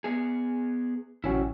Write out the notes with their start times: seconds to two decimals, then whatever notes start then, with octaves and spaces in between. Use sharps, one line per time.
0.04 B3 G#4
1.24 A1 C3 F#3 C#4 E4 F#4